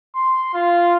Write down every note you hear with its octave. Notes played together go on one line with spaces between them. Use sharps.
C6
F4